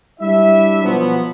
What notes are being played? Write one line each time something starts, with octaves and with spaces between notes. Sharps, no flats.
G3 D4 E4 E5
B2 F3 F#3 B3